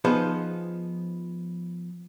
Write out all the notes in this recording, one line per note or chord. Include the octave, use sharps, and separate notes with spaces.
F3 B3 D#4 G#4 C5